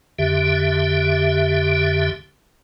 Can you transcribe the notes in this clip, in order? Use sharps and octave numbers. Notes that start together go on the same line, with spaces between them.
F2 D3 G4 E5